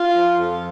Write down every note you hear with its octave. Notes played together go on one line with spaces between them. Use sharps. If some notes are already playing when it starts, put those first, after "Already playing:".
Already playing: F4
F3
F2